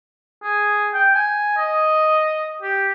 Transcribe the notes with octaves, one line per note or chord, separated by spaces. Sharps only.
G#4
G5
G#5
D#5
G4